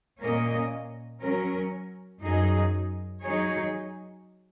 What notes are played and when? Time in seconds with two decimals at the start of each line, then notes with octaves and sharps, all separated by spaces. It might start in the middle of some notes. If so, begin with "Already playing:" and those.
0.20 A#2 A#3 C#4 A#4 D#5
1.21 F#3 C#4 A#4
2.23 F#2 F#3 D#4 G#4 D#5
3.24 F#3 D#4 G#4 C#5